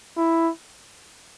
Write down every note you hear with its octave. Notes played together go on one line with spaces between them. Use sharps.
E4